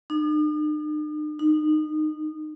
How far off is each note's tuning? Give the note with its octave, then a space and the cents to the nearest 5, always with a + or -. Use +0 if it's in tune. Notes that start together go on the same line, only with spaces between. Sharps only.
D#4 -45
D#4 -25